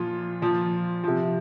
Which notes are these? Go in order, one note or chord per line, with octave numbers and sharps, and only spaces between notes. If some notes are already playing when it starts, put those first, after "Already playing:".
Already playing: A#2 F3 F4
A#2 F3
C3 F3